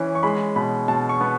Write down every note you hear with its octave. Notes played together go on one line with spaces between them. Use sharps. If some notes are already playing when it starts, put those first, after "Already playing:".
Already playing: E3 C#4
C#6
G#3 B5
B2 B5
B2 A5
C#6
B3